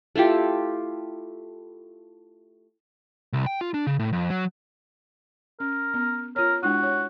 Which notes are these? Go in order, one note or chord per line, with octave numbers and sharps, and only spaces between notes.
A3 E4 F4 G4
C2
G5
F4
D4
C#3
A2
F2
F#3
C#4 A#4
B3
F4 A#4 C#5
G#3 D4 E4 F#4
C#5